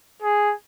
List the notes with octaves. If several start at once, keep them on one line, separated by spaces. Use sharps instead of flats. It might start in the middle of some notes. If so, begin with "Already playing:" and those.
G#4